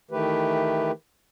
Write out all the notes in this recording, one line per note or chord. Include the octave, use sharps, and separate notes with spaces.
D#3 E3 A3 G4 B4